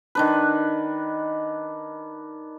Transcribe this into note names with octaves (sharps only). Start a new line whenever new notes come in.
D#3 D4 B4